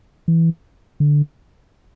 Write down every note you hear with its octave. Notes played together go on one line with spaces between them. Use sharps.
E3
D3